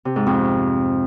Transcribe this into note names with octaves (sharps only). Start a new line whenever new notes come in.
C3
G#2
F2